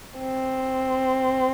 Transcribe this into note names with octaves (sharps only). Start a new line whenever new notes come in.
C4